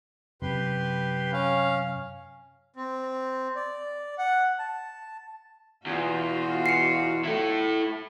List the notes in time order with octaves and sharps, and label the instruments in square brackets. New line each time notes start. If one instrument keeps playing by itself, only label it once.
[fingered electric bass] F#2 C3 [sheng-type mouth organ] G4 B4 C6
[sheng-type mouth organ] C#4 F5
C4
D5
F#5
A5
[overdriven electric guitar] E2 [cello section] B2 F4 F#4
[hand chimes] C7 C#7
[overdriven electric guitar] E4 A4